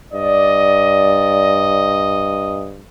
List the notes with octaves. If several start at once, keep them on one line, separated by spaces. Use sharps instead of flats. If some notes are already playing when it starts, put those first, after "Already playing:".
G2 D5 D#5